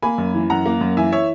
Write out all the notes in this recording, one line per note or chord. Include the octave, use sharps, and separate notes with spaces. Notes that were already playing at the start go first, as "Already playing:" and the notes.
A#3 G#5 B5
F#2
E3
F#2 F#5 A#5
A#3
F#2
E3 E5 G#5
C#5 E5